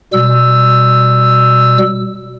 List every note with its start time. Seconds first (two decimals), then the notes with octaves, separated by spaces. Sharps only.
0.13 B2 G3 E6